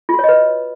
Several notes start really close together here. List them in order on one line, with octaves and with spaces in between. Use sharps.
F4 F#4 C#5 D#5 B4